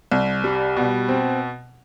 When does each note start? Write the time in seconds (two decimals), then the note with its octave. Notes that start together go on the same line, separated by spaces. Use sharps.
0.12 C2
0.44 G3
0.77 B2
1.08 C4